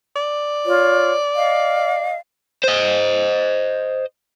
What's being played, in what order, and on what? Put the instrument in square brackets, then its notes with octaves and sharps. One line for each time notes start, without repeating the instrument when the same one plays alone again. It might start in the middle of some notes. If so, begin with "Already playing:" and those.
[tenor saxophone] D5
[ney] F4 [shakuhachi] C#5
[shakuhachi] D#5 [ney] F5
[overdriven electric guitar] C5 D#5